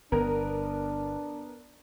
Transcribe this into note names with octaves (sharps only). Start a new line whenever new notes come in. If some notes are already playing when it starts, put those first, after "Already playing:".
G1 B3 D4 A#4